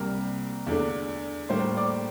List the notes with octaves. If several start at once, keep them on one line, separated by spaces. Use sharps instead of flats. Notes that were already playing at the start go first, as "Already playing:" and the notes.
Already playing: C2 C3 G3 A#3 A#4 A#5
E2 D3 A3 D4
A2 G3 A#3 D4 C5 C6
D5 D6